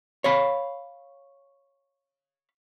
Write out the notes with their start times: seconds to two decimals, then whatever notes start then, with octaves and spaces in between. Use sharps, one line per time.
0.24 C#5 F5 B5